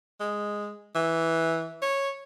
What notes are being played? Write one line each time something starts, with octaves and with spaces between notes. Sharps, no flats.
G#3
E3
C#5